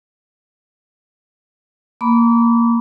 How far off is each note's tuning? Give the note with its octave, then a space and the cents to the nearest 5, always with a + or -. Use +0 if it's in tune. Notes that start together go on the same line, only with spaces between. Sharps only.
A#3 +0 B5 +0 D6 -30